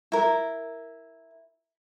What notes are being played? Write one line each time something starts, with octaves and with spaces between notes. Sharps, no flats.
E4 A#4